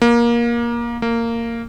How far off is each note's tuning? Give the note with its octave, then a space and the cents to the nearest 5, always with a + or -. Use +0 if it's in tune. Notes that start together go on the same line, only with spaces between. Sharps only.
A#3 +20
A#3 -15